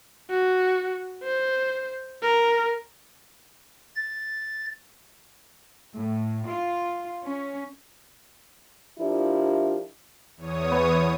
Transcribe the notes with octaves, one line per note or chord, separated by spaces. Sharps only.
F#4
C5
A#4
A6
A2
F4
C#4
F3 D4 E4 F4 G4 A#4
E2 C#5 D#6
B3